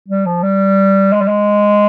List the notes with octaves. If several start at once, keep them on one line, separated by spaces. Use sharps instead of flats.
G3
F3
G3
G#3
G3
G#3